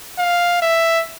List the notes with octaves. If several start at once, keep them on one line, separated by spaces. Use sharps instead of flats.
F5
E5